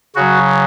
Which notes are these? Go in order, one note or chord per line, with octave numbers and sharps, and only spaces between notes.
C#3 F#3 F#4